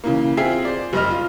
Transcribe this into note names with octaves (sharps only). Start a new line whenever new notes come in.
C#3 E3 A#3
C4 F4 G#4 E5 G5 C7
C5 D5
F#1 G3 D#5 F6
F4